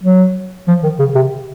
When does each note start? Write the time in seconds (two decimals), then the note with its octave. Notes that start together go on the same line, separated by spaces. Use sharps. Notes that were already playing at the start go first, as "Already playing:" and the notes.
0.03 F#3
0.68 F3
0.83 D#3
0.99 C#3
1.15 C3